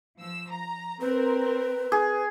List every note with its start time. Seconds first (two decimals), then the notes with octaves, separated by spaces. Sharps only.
0.20 F3 E6
0.50 A#5
1.01 C4 A#4 B4
1.92 G#4